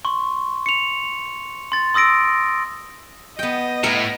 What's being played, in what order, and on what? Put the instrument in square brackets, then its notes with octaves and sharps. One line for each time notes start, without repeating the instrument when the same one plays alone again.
[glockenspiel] C6 C#6
C#7 F7
C6 A6
C6 D#6 E6 A#6 D7
[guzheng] B3 G5 [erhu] D#5
[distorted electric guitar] A2 [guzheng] A#4 F#5